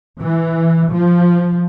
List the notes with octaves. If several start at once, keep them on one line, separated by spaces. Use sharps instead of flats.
E3
F3